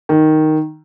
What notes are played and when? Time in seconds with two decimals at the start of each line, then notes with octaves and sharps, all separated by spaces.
0.09 D#3